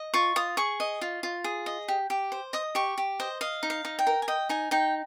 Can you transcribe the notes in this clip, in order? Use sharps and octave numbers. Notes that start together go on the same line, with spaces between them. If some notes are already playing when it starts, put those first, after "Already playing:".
Already playing: D#5
F4 C#6
F4 D#6
G#4 C#6
D#5
F4
F4
G#4
D#5
G4
G4
C5
D#5 D#6
G4 C#6
G4
C5 D#5
D#5 F5
D#4
F5
D#4
G5
A#4
G#5
D#5 G5
D#4 G#5
D#4 G5